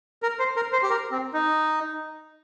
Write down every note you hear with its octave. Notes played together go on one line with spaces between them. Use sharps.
A#4
C5
A#4
C5
G4
A#4
C4
D#4